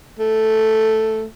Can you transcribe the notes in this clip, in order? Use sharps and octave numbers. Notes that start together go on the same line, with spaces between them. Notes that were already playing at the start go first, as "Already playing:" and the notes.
A3